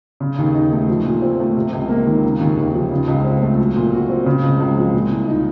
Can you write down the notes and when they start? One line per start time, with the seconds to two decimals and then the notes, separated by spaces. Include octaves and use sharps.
0.20 C#3
0.38 D#2
0.55 D#4
0.72 A3
0.89 F3
1.05 A#2
1.22 C4
1.40 A3
1.57 C3
1.73 C#2
1.89 A#3
2.06 D#3
2.24 C#3
2.40 D#2
2.57 D#2
2.74 F3
2.91 C#3
3.08 C#2
3.24 C4
3.42 A3
3.59 F#3
3.76 A#2
3.93 F#4
4.10 C4
4.26 C#3
4.43 C#2
4.60 C#2
4.77 F3
4.93 A#2
5.11 C2
5.28 D#4